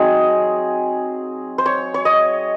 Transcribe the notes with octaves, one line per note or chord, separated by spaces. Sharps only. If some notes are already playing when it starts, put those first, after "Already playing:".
Already playing: F#3 C4 D#4 G#4
C5
C#5
C#5
D#5